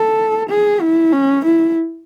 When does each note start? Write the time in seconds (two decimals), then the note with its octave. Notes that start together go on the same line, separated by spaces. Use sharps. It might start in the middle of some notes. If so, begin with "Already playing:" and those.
Already playing: A4
0.50 G#4
0.81 E4
1.12 C#4
1.45 E4